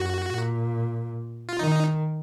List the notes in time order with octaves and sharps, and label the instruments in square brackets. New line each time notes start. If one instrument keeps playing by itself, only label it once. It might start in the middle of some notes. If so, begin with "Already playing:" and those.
Already playing: [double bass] F#2 [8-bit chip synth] F#4
[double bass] A#2
[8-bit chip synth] F4
[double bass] D#3 [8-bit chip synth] D#4